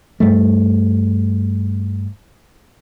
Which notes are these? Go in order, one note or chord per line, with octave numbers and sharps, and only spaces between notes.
G2 G3 A3